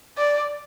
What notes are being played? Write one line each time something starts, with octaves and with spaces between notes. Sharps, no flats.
D5